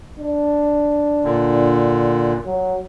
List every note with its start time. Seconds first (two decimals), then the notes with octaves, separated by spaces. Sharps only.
0.20 D4
1.24 A#2 D3
2.46 F#3